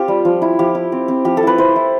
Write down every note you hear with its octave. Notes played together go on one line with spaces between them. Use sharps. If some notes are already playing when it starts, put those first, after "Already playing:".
Already playing: C4 F4 G4
G3
F3
E4
F3 G4
E4
C4
C4
F3 G4
A4
E4 B4
E4 C5
E4